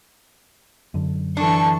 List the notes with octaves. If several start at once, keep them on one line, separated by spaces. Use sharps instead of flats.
F#2 D3
E3 D4 A4 C#6